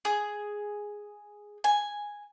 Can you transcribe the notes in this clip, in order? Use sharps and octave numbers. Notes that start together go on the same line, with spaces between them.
G#4
G#5